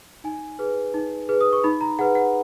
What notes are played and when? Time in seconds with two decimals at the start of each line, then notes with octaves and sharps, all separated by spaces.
0.24 D#4 G#5
0.59 G#4 B4
0.94 D#4
1.29 G#4 B4
1.41 D#6
1.53 C#6
1.64 D#4 B5
1.81 A#5
1.99 G#4 B4 F#5
2.15 F#5